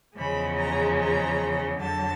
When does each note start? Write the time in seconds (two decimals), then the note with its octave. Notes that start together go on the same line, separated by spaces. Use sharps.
0.17 E2 C#3 F3 G#3 B5
0.58 A#5
0.98 A#5
1.79 F2 D3 F#3 A5